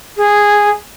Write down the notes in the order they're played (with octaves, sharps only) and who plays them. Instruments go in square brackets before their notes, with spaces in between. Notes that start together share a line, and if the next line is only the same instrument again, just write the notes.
[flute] G#4